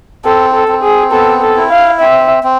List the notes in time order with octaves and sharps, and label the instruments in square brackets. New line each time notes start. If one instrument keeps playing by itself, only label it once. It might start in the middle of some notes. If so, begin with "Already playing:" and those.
[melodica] C4 [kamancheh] A4
[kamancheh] A4
[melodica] C4
[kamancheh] G#4
[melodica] B3 [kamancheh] A4
[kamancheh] A4
[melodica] E4
[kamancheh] F5
[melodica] C4 [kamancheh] E5
[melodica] C4